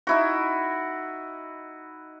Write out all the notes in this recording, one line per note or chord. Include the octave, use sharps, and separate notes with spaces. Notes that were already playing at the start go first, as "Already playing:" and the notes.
D#4 E4 F#4